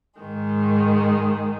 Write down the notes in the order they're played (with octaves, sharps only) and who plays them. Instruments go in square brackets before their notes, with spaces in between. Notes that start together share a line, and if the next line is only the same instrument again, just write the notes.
[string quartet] G#2 D#3 G#3